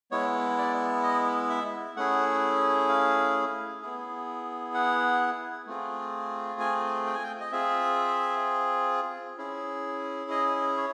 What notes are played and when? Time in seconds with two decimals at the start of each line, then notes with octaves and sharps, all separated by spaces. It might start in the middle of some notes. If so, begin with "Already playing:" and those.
0.11 G#3 B3 E4 C#5
0.58 D5
1.03 D#5
1.50 E5
1.96 A3 C#4 E4 G#4 F#5
2.89 F5
3.82 B3 E4 G#4
4.74 F#5
5.67 A3 C4 F4 G#4
6.60 G#5
7.06 G5
7.15 G#5
7.23 G5
7.40 D#5
7.52 C4 F4 G#4 E5
9.38 C#4 E4 G#4
10.31 D#5
10.77 C#5